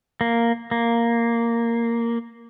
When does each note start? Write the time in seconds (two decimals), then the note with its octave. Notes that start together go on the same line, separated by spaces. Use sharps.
0.21 A#3
0.71 A#3